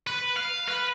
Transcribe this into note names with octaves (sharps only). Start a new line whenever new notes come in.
B4
F5
B4